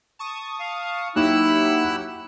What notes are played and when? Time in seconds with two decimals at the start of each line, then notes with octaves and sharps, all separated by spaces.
0.19 A5 C#6 D#6
0.60 F5
1.16 F#3 A#3 D#4 E4 G4 F#5 E6 F#6